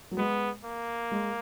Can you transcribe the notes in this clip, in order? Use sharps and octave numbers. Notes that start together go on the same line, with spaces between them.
F#3
G#3 B3
A#3
G#3